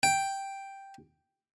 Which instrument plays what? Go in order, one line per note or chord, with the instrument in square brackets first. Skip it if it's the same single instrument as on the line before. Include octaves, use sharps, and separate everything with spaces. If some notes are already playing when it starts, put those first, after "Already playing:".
[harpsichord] G5